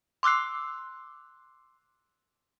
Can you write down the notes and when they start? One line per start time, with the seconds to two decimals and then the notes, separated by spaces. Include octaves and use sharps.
0.23 C6 D6 E6 F#6 C7